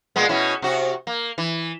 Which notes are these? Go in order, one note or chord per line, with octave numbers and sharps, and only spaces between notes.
A#2 G#3 B3
B2 C#4 E4
C3 F#4
A#3
E3